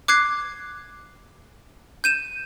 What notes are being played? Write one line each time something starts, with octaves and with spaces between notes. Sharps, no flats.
D6 F#6 G#6 C7
G6 D#7 E7